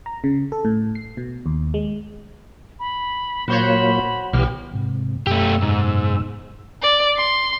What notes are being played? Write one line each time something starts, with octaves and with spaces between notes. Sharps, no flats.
A#5
C#3
A4
A2
C7
B2
D#2
G#3
B5
A#2 F#3 A#3 F#4 C5 C#5 B5
B1 E3 G3 G4 F6
G#2 C3
F#2 B2 A3 G4 E6
G#2
D5
C6